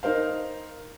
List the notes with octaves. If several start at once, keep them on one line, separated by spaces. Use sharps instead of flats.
D#4 A#4 C5 F5